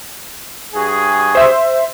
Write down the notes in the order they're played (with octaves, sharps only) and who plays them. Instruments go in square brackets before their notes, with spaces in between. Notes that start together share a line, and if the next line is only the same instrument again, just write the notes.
[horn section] G2 F#4 G#4
[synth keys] C5 E5